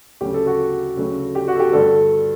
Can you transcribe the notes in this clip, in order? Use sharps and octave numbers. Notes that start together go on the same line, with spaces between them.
D2 C#3 F#3 A3 G4
A4
F#4
D2 C#3 F#3 A3
G4
F#4
A4
G4
G2 D3 A3 A4